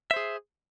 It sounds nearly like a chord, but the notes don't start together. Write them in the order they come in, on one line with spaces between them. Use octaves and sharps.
E5 C5 G#4